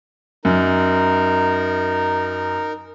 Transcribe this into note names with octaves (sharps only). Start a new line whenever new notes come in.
F#2 D#4 A#4